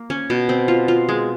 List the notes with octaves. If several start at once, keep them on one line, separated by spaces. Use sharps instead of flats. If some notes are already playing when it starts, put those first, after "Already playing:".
Already playing: A#3
C#4
B2
C4
F4
F4
G#3